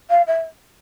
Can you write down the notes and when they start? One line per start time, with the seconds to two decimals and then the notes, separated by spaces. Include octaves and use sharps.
0.09 F5
0.27 E5